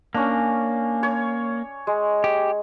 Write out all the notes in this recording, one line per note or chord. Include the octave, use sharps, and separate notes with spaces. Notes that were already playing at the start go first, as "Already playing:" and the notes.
A#3 C#4 D4
C#5
G#3
G4